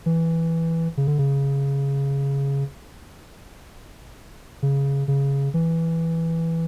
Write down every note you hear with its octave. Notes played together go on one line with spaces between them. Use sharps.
E3
C#3
D3
C#3
C#3
C#3
E3